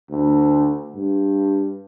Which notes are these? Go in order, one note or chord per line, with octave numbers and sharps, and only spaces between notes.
D2
G2